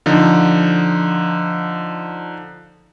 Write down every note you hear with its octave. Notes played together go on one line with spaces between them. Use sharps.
D3 F3 D#4